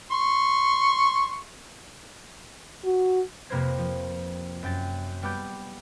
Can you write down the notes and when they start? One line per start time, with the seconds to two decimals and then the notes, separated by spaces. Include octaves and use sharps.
0.11 C6 C#6
2.84 F#4
3.49 F2 C3 A#3 B4 C5 G#6
3.78 F3
4.63 F#2 G5 A6
5.22 G3 B3 D6 G6